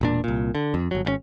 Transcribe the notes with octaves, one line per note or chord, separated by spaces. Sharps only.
E1 A#2 D4
C2 A#2
D3
F2
G1 F#3
G#1 C#3 C#4